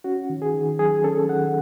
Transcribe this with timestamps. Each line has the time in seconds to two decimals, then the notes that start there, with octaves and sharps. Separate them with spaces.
0.04 C#4 F#4
0.30 D#3
0.42 G#4
0.54 D#3
0.79 F#3 G#4
1.04 C#4 A4
1.29 D#3 F#5